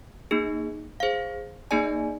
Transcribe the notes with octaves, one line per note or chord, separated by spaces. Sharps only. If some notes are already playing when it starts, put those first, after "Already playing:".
A#3 D#4 G#4
G#4 C5 F5
A#3 D#4 G#4 D5 G#5